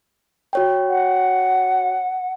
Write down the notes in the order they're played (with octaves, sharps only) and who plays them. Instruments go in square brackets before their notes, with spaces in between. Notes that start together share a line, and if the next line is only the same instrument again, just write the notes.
[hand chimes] F#4 C#5 G5
[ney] F#5